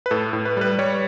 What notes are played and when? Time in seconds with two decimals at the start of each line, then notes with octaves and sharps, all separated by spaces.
0.06 B4
0.11 A2 A4
0.33 A2
0.45 B4
0.57 G3 B4
0.79 G3 C#5